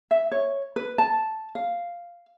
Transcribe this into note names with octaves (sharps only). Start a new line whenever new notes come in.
E5
C#5
B4
A5
F5